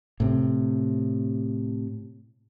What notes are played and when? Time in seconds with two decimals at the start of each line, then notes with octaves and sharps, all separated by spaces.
0.20 A2 C3